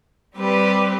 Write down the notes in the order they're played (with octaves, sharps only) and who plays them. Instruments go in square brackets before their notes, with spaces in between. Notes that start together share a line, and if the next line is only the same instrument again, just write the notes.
[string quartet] G3 C4 G4 B4